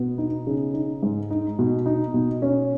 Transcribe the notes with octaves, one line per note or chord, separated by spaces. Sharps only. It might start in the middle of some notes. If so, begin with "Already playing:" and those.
Already playing: B2 B3
D#4
C#3
D#4
G#2
D#4
B2
D#4
B2
C#4